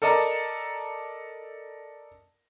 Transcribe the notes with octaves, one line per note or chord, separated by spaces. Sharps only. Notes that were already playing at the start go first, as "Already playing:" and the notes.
A4 A#4 D5 D#5 A5 A#5